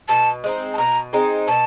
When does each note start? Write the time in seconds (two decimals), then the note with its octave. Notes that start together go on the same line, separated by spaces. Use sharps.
0.09 B2 A5
0.44 G#3 C4 D#4
0.74 A5
0.78 B2 A#5
1.13 G#3 C4 D#4
1.48 B2 A5